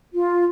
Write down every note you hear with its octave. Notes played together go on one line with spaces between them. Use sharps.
F4